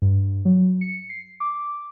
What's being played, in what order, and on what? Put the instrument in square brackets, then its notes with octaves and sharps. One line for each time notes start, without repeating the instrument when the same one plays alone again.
[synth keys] G2
F#3
C#7
C7
D6